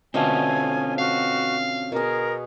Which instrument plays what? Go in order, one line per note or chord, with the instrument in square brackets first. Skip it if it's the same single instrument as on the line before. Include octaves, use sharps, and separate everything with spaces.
[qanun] B2 D3 A3 [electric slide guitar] C4 C#4 F4 [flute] G#5
[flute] F#4 [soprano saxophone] F5
[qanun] B2 G#4 [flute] A#4